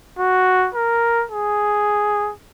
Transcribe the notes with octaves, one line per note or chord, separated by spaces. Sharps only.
F#4
A#4
G#4